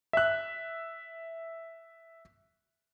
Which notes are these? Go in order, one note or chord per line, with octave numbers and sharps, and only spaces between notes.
E5 F#6